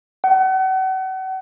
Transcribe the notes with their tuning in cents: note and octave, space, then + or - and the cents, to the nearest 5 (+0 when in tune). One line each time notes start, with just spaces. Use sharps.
F#5 +40